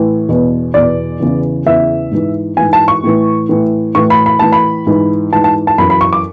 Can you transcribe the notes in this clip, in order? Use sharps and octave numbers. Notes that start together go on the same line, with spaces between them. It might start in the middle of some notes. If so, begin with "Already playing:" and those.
Already playing: A2 E3
E2 B2
E2 B2 D5
E2 C#3 E3
E2 C#3 E3 E5
G#2 E3
G#2 E3 G#5
A5
C#6
A2 E3
A2 E3
A2 E3 C#6
B5
B5
A2 E3 A5
B5
G#2 E3
G#2 E3 A5
A5
A5
F#2 E3 B5
B5
C#6
D6